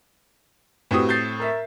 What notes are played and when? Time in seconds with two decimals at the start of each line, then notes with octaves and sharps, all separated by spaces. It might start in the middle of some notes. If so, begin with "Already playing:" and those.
0.91 A2 C4 F#4 G4 B4 D#6
1.09 G6 A6 C7
1.40 A#4 E5